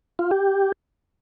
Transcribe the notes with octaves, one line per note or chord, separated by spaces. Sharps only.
F4
G4